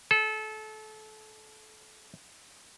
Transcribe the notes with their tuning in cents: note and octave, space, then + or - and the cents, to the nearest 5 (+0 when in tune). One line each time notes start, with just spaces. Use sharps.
A4 -25